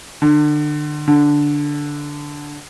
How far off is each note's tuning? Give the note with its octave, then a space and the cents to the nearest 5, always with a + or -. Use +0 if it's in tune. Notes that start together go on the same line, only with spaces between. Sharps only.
D3 +30
D3 -5